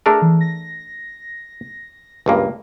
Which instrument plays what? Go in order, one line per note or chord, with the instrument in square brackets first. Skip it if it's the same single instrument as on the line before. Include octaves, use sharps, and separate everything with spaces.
[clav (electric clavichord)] A3 D4 A#4 [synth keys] G#4
[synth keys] E3
A#6
[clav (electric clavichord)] C#2 G2 A#3